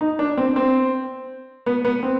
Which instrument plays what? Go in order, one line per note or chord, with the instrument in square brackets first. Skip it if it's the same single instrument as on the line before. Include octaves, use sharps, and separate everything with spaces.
[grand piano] D#4
D4
C4
C4
B3
B3
C4